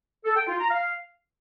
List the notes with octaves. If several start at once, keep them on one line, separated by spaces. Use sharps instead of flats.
A4
G5
F4
A#5
F5